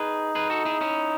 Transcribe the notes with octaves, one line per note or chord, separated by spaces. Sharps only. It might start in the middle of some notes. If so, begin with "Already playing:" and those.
Already playing: D#4 G#4 B4
G#4 B4
F#4 A4
E4 G#4
C#4 E4